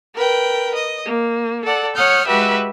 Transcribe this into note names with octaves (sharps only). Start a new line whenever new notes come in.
A#4 B4 G5
D#5
A#3
A4 D5 F#5
C#5 F#5 D#6 F6 G6
G#3 F#4 G4 B4 E5